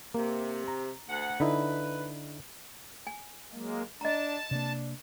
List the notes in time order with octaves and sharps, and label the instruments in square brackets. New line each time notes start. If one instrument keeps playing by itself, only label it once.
[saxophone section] C3 [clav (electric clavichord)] A#3
[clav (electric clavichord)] A#5
[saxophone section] D2 F#5
[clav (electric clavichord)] D3 D#4 E4 [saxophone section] B4
[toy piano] G#5
[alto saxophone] F#3 [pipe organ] G#3 A#3
[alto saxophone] D4 [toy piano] D#5 A#5 [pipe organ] A5
[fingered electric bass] C3 A#3 [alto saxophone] D4